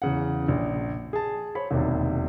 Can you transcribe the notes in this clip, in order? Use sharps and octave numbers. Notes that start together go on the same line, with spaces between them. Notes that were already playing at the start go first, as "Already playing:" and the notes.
E2 C#3 F#5
A#1
G#4 A5
C5 C#5 B5
E1 D#2 C3